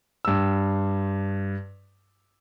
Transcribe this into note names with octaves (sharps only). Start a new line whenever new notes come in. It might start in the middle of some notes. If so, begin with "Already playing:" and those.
G2 E6